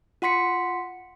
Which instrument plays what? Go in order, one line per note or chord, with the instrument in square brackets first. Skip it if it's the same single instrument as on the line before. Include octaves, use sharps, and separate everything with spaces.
[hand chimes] F4 F#5 C6 B6 C#7